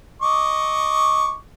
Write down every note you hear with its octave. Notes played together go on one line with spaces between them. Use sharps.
D#5 C#6 D6